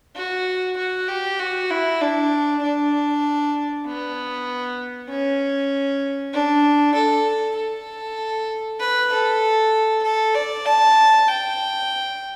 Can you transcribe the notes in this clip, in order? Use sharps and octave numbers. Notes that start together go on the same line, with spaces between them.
F#4
F#4
G4
F#4
E4
D4
D4
B3
C#4
D4
A4
A4
B4
A4
A4
D5
A5
G5